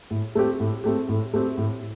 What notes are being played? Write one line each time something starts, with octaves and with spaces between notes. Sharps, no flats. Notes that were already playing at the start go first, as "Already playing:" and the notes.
A2
A3 C4 G4
A2
A3 C4 G4
A2
A3 C4 G4
A2